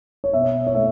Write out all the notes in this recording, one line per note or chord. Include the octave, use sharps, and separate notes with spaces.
C#5
B2 E5
C#5
A3 E5